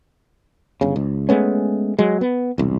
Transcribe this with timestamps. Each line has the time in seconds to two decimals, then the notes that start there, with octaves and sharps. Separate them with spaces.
0.81 G1 C#3
0.96 C#2
1.29 G#3 A3 B3 C#4
1.99 F#3 G#3
2.21 B3
2.58 E1 C2